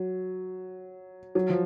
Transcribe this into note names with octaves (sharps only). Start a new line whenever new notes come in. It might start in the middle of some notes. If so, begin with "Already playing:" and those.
Already playing: F#3
F#3
F3